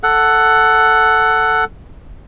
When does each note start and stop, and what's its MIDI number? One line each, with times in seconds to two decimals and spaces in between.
0.03 1.64 69
0.03 1.64 78